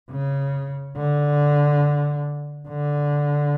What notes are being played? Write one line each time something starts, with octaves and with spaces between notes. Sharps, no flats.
C#3
D3
D3